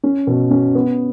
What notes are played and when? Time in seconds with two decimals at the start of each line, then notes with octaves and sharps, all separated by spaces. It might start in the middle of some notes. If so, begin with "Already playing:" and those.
0.03 C#4
0.27 B2
0.51 C#4
0.75 B3